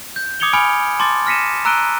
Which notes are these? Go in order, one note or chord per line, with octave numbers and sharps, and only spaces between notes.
G6
D6 D#6 G#6 C#7 F7 G7
G#5 B5 F6 C#7 D7
A5 C6 D6 A6
F6 A#6 B6 C#7 D#7 E7
A#5 E6 F#6 D7 D#7 G7